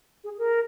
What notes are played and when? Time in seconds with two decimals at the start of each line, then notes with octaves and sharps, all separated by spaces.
0.24 G#4
0.38 A#4